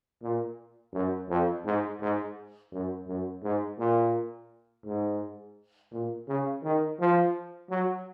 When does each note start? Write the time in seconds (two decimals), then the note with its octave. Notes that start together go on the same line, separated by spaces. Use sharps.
0.22 A#2
0.93 F#2
1.29 F2
1.65 G#2
2.00 G#2
2.72 F#2
3.07 F#2
3.43 G#2
3.78 A#2
4.85 G#2
5.92 A#2
6.28 C#3
6.64 D#3
6.99 F3
7.70 F#3